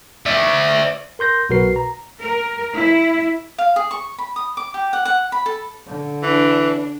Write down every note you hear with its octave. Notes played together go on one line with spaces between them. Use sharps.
D5 E5
A#4 C6 G6 A#6
B1 B2 F#4 A#4 B4 C7
A#5
A#4
E4
F5
G#4
C#6
B5
D#6
D6
G4
F#5
F#5
B5
A4
D3
E3 D4